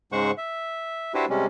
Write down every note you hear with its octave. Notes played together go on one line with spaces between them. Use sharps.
G#2 C#3 G#3 C5 F#5 C#6
E5
D4 E4 F#4 G4 B4 C5
C3 G3 G#3 C#4